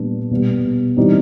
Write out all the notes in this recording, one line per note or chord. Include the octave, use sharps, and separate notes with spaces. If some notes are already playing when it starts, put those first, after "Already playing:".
Already playing: A#2 G3 B3 D4
B2 G3 B3
E3 G3 C4 D#4